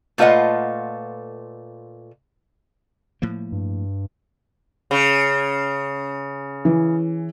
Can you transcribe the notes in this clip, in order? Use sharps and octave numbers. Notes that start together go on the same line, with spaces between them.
A#2 A3 F4 B4 D#5 F#5
A2 F3 A#3
G2
C#3
E3